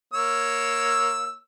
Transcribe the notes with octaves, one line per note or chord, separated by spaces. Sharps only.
A#3 C#5 E6